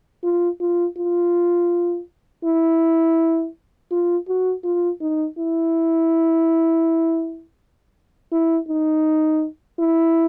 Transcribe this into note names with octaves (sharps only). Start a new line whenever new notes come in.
F4
F4
F4
E4
F4
F#4
F4
D#4
E4
E4
D#4
E4